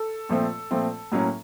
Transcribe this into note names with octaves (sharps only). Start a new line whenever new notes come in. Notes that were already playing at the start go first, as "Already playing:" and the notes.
Already playing: A4
A#2 F3 A3 C4
A#2 F3 A3 C4
A2 F#3 A#3 C#4